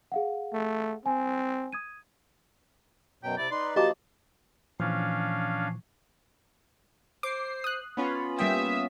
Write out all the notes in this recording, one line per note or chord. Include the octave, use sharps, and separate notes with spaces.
G#4 F5 F#5
A3
C4 G#5
D#6 G#6 D#7
F#2 B2 F#3 G5
C3 E4 D5
D#4 B4 D5 C6
F3 A#3 D#4 F#4 G4 D#5 A5 D6
A#2 E3 F3 C#4 D4 F5
C5 D6 C7
D#6 F#6
B3 C#4 F4 B5
G3 A#3 E5 G5 D#6